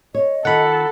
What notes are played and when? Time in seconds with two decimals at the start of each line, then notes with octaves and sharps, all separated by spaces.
0.15 C#5 D#5
0.45 D#3 F4 A4 F#5 B5